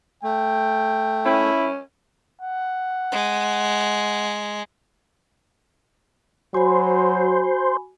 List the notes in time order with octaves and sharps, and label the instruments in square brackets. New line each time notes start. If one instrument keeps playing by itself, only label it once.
[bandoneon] A3 [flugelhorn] G5
[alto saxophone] C#4 [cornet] E4
[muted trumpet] F#5
[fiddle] G#3
[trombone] F#3 [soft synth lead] F#4 [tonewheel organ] C5 [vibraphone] G#5 B5